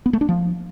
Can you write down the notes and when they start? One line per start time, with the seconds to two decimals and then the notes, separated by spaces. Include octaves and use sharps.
0.06 B3
0.13 A3
0.21 D4
0.29 F3